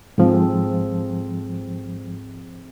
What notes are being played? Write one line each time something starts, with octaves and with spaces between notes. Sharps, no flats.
G#2 F3 C4 G#4 A4